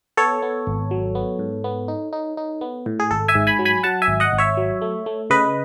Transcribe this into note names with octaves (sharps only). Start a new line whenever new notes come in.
B3 A4 C#5
B3
G#1
F#3
B3
G#2
B3
D#4
D#4
D#4
B3
A2
G#4
G#1 A4
E5 G#5
G#2
G#5 B5
F#3
G#5 B5
F#3 F#5 A5
E5 G#5
G#1
D#5 F#5
G#1
C#5 E5
F#3
A3
A3
C#3 B4 D#5